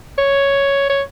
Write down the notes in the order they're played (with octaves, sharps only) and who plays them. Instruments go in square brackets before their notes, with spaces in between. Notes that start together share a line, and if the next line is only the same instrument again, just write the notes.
[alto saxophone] C#5
C#5